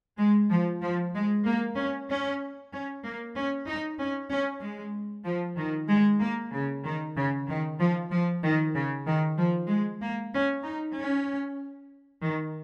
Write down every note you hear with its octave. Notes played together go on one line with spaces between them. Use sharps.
G#3
F3
F3
G#3
A#3
C#4
C#4
C#4
A#3
C#4
D#4
C#4
C#4
G#3
F3
D#3
G#3
A#3
C#3
D#3
C#3
D#3
F3
F3
D#3
C#3
D#3
F3
G#3
A#3
C#4
D#4
C#4
D#3